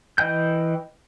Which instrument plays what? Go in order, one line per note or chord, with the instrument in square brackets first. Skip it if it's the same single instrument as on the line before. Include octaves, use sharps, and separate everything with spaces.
[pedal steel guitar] E3 D#5 G5 G6